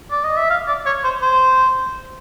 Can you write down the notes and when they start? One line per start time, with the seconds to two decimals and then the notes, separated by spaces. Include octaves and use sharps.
0.11 D5
0.24 D#5
0.37 E5
0.50 F5
0.68 D5
0.86 C#5
1.04 C5
1.22 C5